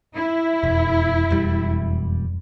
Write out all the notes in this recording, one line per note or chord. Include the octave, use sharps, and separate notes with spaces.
E4
E1 F2
E1 G3